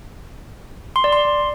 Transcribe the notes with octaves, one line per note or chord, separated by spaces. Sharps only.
C6
D5
C6